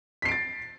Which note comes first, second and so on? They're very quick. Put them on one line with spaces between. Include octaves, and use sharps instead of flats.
B6 C7 D7 A6